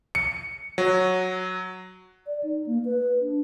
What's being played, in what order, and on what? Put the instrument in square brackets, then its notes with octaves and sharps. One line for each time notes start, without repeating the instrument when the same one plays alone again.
[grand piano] C#7
[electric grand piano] F#3 F#4
[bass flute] D5
D#4
A#3
B4
D4